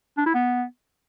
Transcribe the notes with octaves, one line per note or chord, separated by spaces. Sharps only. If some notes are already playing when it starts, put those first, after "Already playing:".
D4
E4
B3